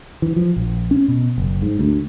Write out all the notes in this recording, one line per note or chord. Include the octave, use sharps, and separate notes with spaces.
E3
F3
A#1
C#4
B2
F#1
G#2
D2